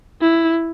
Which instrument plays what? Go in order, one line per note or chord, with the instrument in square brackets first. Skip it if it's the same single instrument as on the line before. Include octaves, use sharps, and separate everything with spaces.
[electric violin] E4